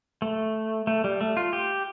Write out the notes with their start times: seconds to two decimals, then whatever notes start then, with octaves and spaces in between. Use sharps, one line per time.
0.22 A3
0.87 A3
1.04 G3
1.21 A3
1.37 F4
1.53 G4